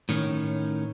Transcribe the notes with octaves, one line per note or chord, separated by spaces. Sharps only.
A2 D#3 C#4